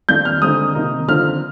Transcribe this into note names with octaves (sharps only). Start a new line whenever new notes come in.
F2 D#3 A#3 D4 G6
F6
D3 G#3 C4 D#4 D#6
C3 D#3 A#3 D#4
D3 F3 C4 F6